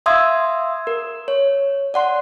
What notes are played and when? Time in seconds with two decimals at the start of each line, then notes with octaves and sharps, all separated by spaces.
0.06 E5 F5 C6 D#6 E6 G#6
0.87 A#4
1.28 C#5
1.94 D5 F#5 C6